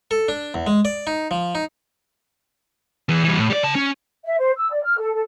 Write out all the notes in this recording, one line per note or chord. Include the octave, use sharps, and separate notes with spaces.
A4
D4
E2
G#3
D5
D#4
F3
D#4
E2 E3
E3 G3
A2
G3 D5
C#3 A5
C#4
E5
C5
E6
D5
F6
A4
A4